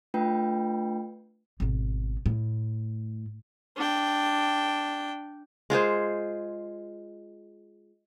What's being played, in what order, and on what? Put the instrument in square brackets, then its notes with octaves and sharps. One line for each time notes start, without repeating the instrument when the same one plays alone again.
[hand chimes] A3 D4 F4 B4 G5
[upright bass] G#1 B2
A2
[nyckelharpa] D4 G5
[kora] G#3 F4 G#4 C5